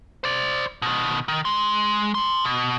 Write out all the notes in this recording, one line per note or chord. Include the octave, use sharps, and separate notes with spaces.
C5 D5
B2 D#3
D#3
G#3 C6
A5 C6
B2